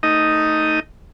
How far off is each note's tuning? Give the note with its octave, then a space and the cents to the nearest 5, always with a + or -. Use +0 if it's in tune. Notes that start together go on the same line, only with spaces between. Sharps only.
A3 +10 D#4 +0 D#5 +0